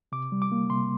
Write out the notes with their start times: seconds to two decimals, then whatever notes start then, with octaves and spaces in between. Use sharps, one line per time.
0.12 C3 D6
0.32 G3
0.42 D6
0.52 A#3
0.70 C3 C6